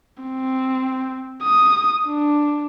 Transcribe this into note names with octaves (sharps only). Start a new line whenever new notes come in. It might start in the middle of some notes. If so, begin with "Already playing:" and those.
C4
D#6
D4